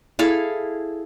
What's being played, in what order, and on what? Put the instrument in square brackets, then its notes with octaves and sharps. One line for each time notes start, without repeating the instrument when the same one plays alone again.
[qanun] E4 G#4 A4 F5